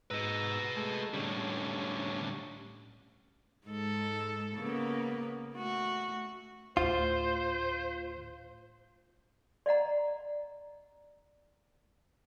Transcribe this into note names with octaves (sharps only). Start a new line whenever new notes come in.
G#2 B4 D#5 A#5 E6
G#3 A3
A2 D3 G3 C#4
G#2 G#3 A4
C#3 A#3 B3
A3 F#4
D2 A2 F4 C5
D5 D#5 F#5 A#5